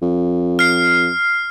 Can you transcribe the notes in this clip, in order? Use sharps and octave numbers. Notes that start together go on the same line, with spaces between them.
F2
F6 C7